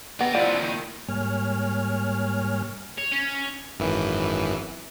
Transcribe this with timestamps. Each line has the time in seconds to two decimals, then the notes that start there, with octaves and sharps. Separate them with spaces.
0.21 B3 G4 A#5
0.35 C3 F3 A#3 E4 D5
0.60 D#3
1.09 G#2 G3 A#3 C#5 G#5 F6
2.98 C#5
3.12 C#4
3.79 G#1 F#2 E3